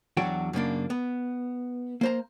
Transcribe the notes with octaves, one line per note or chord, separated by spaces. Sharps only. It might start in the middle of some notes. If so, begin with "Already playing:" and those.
E2 F#3 D4 F#4 G5
F#2 C#3 A#3 D4
B3
A#3 C5 A#5